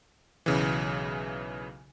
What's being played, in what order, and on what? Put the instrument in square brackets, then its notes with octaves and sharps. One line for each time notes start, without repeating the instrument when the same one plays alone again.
[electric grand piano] B1 C#3 E3